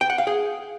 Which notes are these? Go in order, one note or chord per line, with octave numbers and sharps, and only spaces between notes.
G5
F#5
F5
G#4